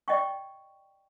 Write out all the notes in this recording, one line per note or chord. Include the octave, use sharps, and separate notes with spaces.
D5 D#5 G5 C#6